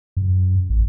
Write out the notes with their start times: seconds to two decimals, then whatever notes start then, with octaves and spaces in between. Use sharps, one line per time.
0.17 F#2
0.70 A1